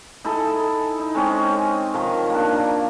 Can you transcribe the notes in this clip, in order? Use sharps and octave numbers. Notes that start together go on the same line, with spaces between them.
D#4 E4 G#4 A4
D#4
G#3 C4 C#4 D#5
D#3 F3 A#4
A#3 D4